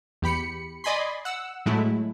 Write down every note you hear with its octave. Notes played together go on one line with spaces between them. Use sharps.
E2 G4 B5 C#7
D5 D#5 G#5 B5 C6
F#5 E6
A2 F#3 G#3 A3 E4